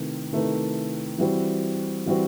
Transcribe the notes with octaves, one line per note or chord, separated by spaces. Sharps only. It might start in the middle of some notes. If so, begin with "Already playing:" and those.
Already playing: C3 D#3 A3 E4 B4
C3 D#3 A3 E4 B4
E3 G3 C4 F#4
E3 G3 C4 F#4